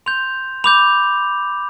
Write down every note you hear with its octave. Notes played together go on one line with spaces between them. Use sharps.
C6 G6 F7
B5 D6 G6 F7